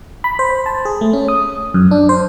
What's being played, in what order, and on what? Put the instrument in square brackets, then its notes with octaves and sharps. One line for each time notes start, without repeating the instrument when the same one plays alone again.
[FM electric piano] B5
C5
A5
G#4
A3
C#4
D#6
F#2
D4
C5